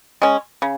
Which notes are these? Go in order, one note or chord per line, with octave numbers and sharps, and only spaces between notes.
G#3 C#4
C#3